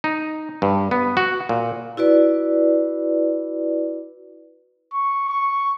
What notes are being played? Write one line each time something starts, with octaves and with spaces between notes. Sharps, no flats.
D#4
G2
B3
F#4
A#2
E4 F#4 B4 D5
C#6
C#6